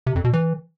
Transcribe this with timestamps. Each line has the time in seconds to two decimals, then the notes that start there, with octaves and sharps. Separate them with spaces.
0.07 C3
0.15 F2
0.24 B2
0.33 E3